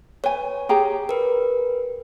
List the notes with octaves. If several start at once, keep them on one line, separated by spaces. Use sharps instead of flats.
B4 C#5 G#5
G4 G#4 A#5
A#4 B4